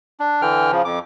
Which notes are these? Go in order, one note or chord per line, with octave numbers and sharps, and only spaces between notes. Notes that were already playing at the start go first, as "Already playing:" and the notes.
D4
D3 E3 G5 F6
C#3 F3
F2 D6